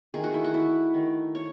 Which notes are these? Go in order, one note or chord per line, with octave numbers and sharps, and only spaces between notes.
D#3 A3 G#4
F#4
E4
F#4
E4
D#3 A3
C#5